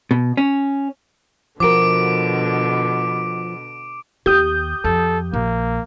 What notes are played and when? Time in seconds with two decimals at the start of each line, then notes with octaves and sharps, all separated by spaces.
0.11 B2
0.37 C#4
1.60 B2 D3 F3 F#4 A#4 D6 D7
4.26 D#2 G4 D#6 G6
4.84 F2 A4
5.33 A#1 A#3